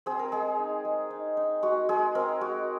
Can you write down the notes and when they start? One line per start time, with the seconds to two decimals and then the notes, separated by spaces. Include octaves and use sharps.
0.06 C4 G#4
0.19 A#4
0.32 G#3 G#4
0.59 D#4
0.85 G#3
1.10 D#4
1.37 D#4
1.63 G#3 F#4
1.89 G#3 G#4
2.15 C4 A#4
2.41 G#3 F#4